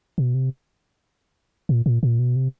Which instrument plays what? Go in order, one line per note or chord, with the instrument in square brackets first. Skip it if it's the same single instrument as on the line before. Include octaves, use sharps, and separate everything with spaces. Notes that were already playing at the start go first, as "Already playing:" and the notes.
[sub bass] B2
C3
A#2
A#2
A#2
B2
C3